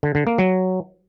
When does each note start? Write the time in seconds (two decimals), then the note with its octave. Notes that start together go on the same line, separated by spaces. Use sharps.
0.03 D3
0.15 D3
0.27 A#3
0.38 F#3